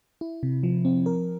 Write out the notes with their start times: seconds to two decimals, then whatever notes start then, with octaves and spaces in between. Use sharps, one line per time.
0.21 E4
0.43 C3
0.63 F3
0.85 C4
1.06 A#4